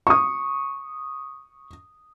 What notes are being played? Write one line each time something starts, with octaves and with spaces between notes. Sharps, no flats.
C#6 D#6